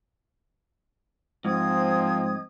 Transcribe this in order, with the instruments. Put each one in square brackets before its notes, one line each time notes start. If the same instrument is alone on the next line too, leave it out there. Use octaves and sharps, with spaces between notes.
[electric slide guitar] G#2 [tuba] F3 [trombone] C4 [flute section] D#5 D#6 G#6